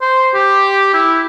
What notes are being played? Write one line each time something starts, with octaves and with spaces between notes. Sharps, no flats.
C5
G4
E4